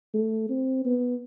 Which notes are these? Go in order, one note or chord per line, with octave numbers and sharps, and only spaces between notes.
A3
C4
B3